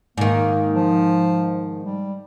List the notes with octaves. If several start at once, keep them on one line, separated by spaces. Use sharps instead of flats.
G#2 D#3 A#3
F3
G3